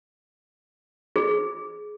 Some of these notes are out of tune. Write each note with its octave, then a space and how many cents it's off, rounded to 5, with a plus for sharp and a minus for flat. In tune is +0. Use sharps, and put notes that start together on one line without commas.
G#4 +15